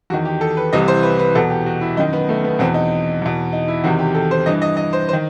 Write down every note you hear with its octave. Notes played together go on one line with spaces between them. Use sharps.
E2 D#3 F#4
G4
A4
B4
C2 C3 E3 D#5
C5
B4
B4
E2 B2 A4
G4
F#4
E4
F#2 D#3 D#4
B3
A3
B3
E2 B2 C4
D#4
E2 B2
D#4
E4
E2 C3 D#3 F#4
G4
A4
C5
G2 E3 D#5
D#5
D#5
C5
C5
D#3